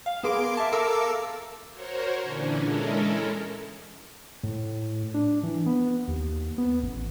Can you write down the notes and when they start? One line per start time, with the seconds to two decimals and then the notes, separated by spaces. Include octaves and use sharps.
0.06 F5
0.23 B3 G#4 A#4 C6 D6 D7
0.57 E5 A5
0.72 A4 A#4 F5 A5 D6 E6
1.72 F#4 A#4 C5 C#5
2.21 A#2 D3 E3 C#4 D4
2.58 G#3 C#4 E4 A4 A#4
4.43 A2
5.14 D4
5.43 E3
5.66 B3
6.08 D#2
6.58 B3
6.83 A1